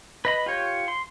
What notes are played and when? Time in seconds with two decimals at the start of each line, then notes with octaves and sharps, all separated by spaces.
0.25 B4 D#5 B5
0.46 F4 G4 C#5
0.88 C6